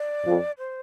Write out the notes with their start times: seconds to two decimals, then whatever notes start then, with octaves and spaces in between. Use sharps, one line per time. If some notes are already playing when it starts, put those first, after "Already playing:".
Already playing: D5
0.25 F2
0.58 C5